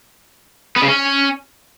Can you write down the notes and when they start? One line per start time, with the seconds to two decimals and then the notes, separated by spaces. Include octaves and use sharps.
0.76 B3
0.82 C#3
0.88 C#4